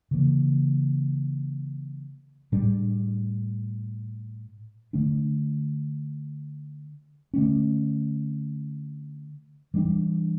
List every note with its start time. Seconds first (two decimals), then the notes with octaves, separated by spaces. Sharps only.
0.11 C#3 E3 A#3
2.52 A2 G3 D4
4.93 D3 A3 D4
7.34 D3 A3 C#4
9.74 E3 G3 A#3 D4